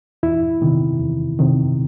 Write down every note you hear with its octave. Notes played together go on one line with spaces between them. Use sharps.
E2 E4
C3 D#3
E2
C3 D#3